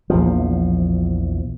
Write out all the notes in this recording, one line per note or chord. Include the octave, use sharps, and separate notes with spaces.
A#1 E2 F3